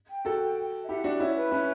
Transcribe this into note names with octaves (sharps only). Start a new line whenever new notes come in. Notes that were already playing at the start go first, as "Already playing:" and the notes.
G5
F#4 A4
E5
E4 G4 F#5
D4 F#4
C#4 E4 C#5
B4
C#4 E4